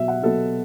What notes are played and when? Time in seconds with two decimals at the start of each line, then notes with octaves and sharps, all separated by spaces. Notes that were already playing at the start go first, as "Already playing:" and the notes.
Already playing: B2 F#3 B3 E5
0.08 F#5
0.23 B2 F#3 B3 A4